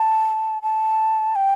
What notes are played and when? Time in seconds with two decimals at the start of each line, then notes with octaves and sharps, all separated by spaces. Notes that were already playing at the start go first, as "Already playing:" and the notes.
Already playing: A5
0.62 A5
1.36 G5